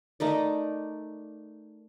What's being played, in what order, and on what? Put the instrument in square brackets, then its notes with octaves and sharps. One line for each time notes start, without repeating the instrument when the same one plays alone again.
[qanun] A3 D#4 A#4 D5